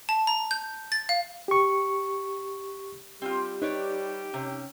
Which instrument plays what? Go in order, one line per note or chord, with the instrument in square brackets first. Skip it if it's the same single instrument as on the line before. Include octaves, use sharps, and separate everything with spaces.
[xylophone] A5
A#5
G6
A6
F5
[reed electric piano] G4 C#6
[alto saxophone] G3 [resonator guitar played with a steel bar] C4 F4 [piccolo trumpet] G4
[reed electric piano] D#4 [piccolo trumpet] G4 [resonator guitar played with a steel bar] B4 C#5 D5
[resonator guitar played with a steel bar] C3 [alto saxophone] C#4